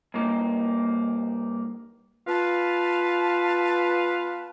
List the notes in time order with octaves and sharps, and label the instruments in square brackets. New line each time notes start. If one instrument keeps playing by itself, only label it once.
[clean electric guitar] G2 A#3 D#4
[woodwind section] B3 F4 B4 F5 A5